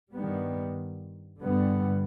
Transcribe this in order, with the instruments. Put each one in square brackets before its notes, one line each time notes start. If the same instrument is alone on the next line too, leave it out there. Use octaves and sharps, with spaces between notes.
[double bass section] G2 D#3 G3 B3
G2 D3 G3 B3